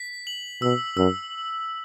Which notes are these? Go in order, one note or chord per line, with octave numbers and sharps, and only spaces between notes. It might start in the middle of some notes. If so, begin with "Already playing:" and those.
Already playing: B6
F#7
B2 E6
F#2 E6